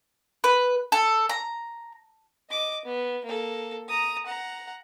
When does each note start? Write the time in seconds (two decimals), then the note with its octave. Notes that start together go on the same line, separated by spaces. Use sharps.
0.44 B4
0.92 A4
1.29 A#5
2.50 D#5 D6
2.85 B3
3.25 A#3 A4
3.89 A#5 D#6
4.26 F#5 A#5